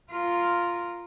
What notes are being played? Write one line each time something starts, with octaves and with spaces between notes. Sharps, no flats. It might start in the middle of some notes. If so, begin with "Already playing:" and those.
F4 A#4